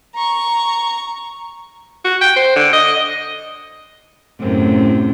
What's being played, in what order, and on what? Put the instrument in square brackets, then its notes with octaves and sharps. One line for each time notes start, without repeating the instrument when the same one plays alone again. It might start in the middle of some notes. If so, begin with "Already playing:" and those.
[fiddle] A#5 C#6
[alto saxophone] F#4
G5
C5
D3
D#5
[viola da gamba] F#2 A2 C3